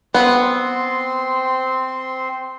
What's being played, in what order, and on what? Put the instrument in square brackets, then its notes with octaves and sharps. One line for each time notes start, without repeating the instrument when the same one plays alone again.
[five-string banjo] B3 [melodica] C4 C6